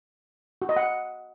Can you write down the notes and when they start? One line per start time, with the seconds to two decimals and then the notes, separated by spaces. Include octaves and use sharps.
0.62 F#4
0.69 D#5
0.76 F#5